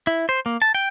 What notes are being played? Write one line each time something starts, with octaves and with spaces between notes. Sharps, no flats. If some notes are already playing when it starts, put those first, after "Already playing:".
E4
C5
A#3
A5
G5